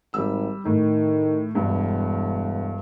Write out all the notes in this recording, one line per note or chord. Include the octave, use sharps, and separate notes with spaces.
G#1 G3 E6
A2 D#3
E1 G2